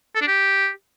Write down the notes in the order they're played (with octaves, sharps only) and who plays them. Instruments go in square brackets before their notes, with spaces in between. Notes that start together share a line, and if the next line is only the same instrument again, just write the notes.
[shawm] A4
D4
G4